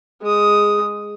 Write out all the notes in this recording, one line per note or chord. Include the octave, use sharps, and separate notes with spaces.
G#3 D#6